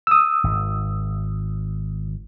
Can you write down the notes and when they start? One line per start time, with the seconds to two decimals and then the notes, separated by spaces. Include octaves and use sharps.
0.07 D#6 E6
0.44 G#1